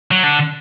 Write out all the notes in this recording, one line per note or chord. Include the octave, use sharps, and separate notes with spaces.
F#3
D3